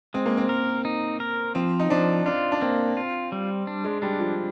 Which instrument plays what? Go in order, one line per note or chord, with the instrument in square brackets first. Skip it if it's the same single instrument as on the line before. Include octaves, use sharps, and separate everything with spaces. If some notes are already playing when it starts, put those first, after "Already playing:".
[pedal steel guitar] G#3 [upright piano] C4
[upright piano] A#3
C4
[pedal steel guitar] A#4
D#4
A#4
[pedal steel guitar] F3 [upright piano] C4
[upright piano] D#4
[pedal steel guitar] F3 [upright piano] D4
[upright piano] D4 [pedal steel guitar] F4
[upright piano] D4
[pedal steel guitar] A#3 [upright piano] C4
[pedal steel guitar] F4
G3
D4
[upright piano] G#3
[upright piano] G3 [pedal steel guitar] D4
[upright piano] F3